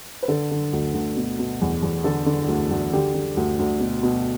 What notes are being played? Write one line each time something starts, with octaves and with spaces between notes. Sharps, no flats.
B4
D3 A4
D3
D2
D2
B2
B2
E2
E2
D3 A4
D3
D2
D2
D3 G4
D3
D2
D2
B2
B2